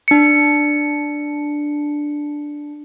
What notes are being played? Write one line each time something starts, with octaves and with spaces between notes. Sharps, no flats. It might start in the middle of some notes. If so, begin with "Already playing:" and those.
D4 C#7